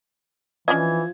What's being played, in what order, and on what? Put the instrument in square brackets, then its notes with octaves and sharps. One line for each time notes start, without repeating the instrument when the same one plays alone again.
[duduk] E3 [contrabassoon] F3 [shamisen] C#4 D4 D#5 [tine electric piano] G#6